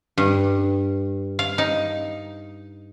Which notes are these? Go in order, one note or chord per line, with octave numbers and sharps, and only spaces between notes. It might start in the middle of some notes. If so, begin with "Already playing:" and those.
G2
F5
D#4